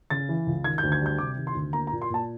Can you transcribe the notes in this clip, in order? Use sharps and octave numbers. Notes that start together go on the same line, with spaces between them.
C#3 A6
E3
C#2
D#3 G#6
G6
D2
G#6
G3
G6
C3 D6
D#3
C6
D2
A#3 A#5
A#5
A#2
C6
A#2 A5